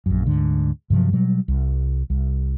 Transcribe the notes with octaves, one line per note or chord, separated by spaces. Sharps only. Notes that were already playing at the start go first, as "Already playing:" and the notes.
A#1 F#2
D2 G#2 D3
G2 C3 F3 F#3
B2 F#3 G3
C2
C2